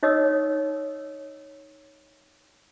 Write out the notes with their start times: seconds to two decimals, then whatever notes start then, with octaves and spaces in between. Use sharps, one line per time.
0.03 D#4 C#5 D#5 D#6 E6